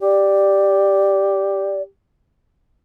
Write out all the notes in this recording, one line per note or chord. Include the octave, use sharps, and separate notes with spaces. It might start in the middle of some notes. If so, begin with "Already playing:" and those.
G4 D5